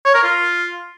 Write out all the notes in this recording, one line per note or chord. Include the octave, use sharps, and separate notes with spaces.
C#5
A#4
F4